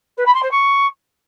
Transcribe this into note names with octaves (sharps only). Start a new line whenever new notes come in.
B4
B5
C6
C5
C#6